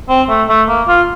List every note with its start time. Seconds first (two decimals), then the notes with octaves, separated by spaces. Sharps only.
0.09 C4
0.29 A3
0.49 A3
0.69 A#3
0.88 F4